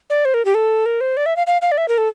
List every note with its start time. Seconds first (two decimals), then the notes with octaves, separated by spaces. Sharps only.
0.10 D5
0.25 C5
0.34 A#4
0.45 G4
0.55 A4
0.86 A#4
1.01 C5
1.17 D5
1.26 E5
1.36 F5
1.47 F5
1.62 F5
1.72 D5
1.78 E5
1.88 A#4
1.98 A4